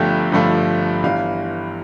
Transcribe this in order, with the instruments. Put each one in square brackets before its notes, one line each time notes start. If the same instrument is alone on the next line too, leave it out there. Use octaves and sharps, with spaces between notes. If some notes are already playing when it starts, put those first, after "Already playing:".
Already playing: [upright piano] G1 G2 D3 F3 A3 G5
G1 G2 D3 F3 A3
G1 G2 E3 F5